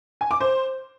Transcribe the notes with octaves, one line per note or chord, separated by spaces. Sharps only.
G#5
D6
C5